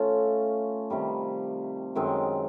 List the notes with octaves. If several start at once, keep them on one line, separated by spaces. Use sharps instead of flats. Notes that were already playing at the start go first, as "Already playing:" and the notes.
Already playing: A3 C#4 F4
C3 D#3 G3
F#2 D#3 G#3 C4